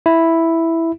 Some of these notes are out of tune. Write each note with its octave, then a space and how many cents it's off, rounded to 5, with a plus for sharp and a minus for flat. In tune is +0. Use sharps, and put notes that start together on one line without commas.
E4 +0